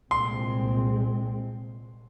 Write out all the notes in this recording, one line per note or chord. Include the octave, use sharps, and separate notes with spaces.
C2 A#2 G#3 C4 C6